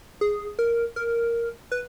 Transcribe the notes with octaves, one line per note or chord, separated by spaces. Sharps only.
G#4
A#4
A#4
B4